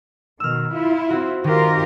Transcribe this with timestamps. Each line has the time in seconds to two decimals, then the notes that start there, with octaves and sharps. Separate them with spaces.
0.40 B2 D#3 E6 F6
0.74 E4 F4
1.10 C4 F#4
1.44 D#3 F4 G4 A#4